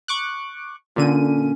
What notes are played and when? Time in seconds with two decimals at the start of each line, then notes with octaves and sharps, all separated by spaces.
0.08 C#6 D6 F#6
0.96 A#2 D3 C#4 D#7